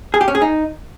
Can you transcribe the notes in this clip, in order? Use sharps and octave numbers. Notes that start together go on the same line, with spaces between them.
G#4
G4
C#4
G#4
D#4